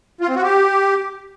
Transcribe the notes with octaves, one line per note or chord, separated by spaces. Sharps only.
F4
C4
F#4
G4